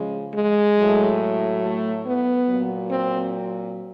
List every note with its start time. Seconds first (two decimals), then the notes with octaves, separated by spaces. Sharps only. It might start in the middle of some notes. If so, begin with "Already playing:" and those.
Already playing: C#3 F3 G#3
0.35 G#3
0.78 A2 F#3
1.62 A3
2.05 B3
2.47 A#2 F#3
2.90 C4